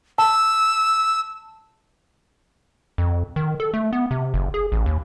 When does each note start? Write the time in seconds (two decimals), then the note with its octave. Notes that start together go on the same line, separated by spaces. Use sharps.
0.18 A5 E6
2.98 F2
3.36 D#3
3.60 A4
3.74 A3
3.93 B3
4.11 C3
4.34 F#1
4.54 G#4
4.72 A1
4.86 D#2